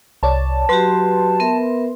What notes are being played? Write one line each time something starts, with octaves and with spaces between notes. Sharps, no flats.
C2 C#5 D5 A5
F#3 F#4 G4 B4 C6
B3 A#4 E5